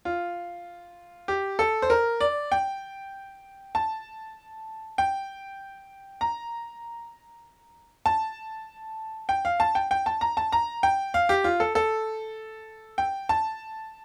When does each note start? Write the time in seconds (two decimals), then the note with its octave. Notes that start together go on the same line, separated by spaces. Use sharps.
0.05 F4
1.28 G4
1.59 A4
1.82 C5
1.90 A#4
2.21 D5
2.52 G5
3.75 A5
4.98 G5
6.21 A#5
8.06 A5
9.29 G5
9.45 F5
9.60 A5
9.75 G5
9.91 G5
10.06 A5
10.21 A#5
10.37 A5
10.52 A#5
10.83 G5
11.14 F5
11.29 G4
11.44 F4
11.60 A4
11.75 A4
12.98 G5
13.29 A5